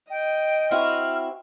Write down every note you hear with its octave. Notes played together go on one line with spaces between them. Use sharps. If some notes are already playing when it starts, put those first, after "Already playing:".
D#5 G5
C4 E4 F#4 F6